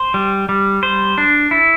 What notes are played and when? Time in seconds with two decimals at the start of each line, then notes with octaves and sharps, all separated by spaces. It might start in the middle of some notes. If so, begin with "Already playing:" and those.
Already playing: C5
0.14 G3
0.49 G3
0.83 C5
1.18 D4
1.51 E4